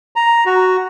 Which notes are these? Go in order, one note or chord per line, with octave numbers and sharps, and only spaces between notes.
A#5
F#4